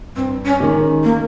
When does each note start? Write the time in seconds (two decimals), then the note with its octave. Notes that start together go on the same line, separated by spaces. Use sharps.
0.16 G2 C4
0.45 C#4
0.60 D#3 G#3 C#4 G4
1.03 A#3